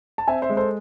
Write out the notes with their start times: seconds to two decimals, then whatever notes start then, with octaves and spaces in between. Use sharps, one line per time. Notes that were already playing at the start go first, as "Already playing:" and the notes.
0.18 A5
0.28 C4 E5 G#5
0.42 C5 E5
0.50 G#3
0.57 A4 C5